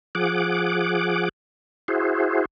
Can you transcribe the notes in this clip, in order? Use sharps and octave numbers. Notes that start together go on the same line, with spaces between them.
F3 G#4 F#5 D6
E4 F#4 G#4 C5